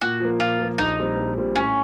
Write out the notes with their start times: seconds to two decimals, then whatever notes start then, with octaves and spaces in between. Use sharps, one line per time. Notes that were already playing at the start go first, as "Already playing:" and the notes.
0.01 A#2 F#4
0.20 F3 A#3
0.40 A#2 F4
0.59 F3 A#3
0.78 A#1 D#4
0.98 A#2 G3 C4
1.17 A#1
1.37 A#2 G3 C4
1.56 A2 C#4